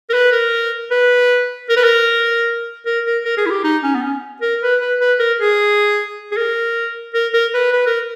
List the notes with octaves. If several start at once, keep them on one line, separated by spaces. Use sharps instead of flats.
A#4
B4
A#4
B4
A#4
B4
A#4
A#4
A#4
A#4
G#4
E4
G4
D#4
C#4
B3
C#4
A#4
B4
B4
B4
A#4
G#4
G#4
A#4
A#4
A#4
B4
B4
A#4